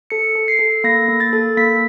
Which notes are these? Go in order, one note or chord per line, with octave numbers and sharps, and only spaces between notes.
A4 C#7
A4
C7
A4
A#3 A#6
A#3
A6
A4
A#3 B6